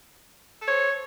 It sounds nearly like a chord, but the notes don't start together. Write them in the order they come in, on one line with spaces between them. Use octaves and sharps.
A4 C#5 C5